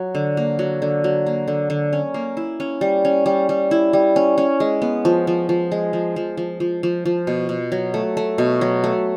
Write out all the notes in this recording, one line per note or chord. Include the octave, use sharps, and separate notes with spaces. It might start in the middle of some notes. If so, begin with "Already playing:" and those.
Already playing: F#3
D3
A#3
F#3
D3
F#3
A#3
D3
D3
C#4
A#3
E4
C#4
G3
C#4
G3
G3
E4
G3
C#4
C#4
G#3
B3
F3
F3
F3
G#3
F3
F3
F3
F3
F3
F3
B2
B2
F#3
A3
A3
B2
F#3
A3